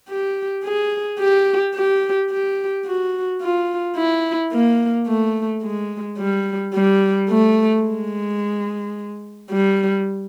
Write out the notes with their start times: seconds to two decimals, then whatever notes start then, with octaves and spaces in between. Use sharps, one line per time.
0.09 G4
0.64 G#4
1.19 G4
1.75 G4
2.30 G4
2.85 F#4
3.41 F4
3.97 E4
4.52 A#3
5.07 A3
5.63 G#3
6.18 G3
6.74 G3
7.29 A3
7.84 G#3
9.51 G3